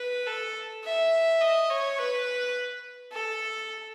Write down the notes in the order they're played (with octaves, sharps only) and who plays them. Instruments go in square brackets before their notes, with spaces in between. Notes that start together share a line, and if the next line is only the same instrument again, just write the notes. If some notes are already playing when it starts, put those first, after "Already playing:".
Already playing: [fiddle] B4
A4
E5
D#5
C#5
B4
A4